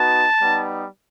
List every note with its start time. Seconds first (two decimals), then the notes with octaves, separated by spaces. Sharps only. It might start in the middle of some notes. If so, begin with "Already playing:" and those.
Already playing: B3 D#4 F#4 A5
0.40 G3 B3 D#4